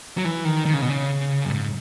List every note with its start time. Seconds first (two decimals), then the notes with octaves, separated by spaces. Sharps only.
0.17 F#3
0.25 E3
0.45 D#3
0.66 D#3
0.74 C#3
0.82 B2
0.90 C#3
1.44 F#2
1.49 G#2